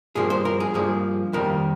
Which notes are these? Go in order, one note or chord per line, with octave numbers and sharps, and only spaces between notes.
G2 F3 A#3 G#4
C5
A#4
G#4
G2 F3 A#3 G#4
F2 D#3 G3 A#3 A#4